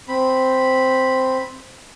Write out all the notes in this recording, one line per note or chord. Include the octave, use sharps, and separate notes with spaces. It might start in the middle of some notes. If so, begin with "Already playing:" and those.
C4 B5